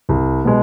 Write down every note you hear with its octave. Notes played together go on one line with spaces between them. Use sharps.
C2
B2 G#3